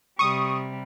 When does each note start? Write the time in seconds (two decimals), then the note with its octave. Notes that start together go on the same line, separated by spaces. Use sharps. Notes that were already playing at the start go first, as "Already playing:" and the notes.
0.19 C3 G3 C#6 D#6